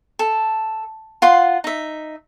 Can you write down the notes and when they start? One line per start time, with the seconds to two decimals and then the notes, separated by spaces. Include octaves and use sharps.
0.19 A4
1.22 F4 F#5 C6
1.64 D#4 E5